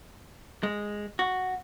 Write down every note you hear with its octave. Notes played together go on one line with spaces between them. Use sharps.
G#3
F#4